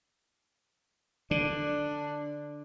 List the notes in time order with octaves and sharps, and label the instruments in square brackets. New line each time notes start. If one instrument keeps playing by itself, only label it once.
[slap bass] D3 [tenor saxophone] D4